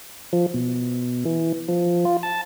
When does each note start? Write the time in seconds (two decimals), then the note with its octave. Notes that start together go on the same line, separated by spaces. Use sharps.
0.33 F3
0.54 B2
1.25 E3
1.68 F3
2.05 F4
2.23 A5